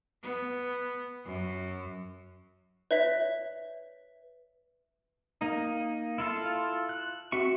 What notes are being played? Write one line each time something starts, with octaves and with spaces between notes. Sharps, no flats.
B3
F#2
B4 C#5 D5 E5 B6
A#3 D#4
E4 F4 A4
F#6
C4 F#4 E5 C#6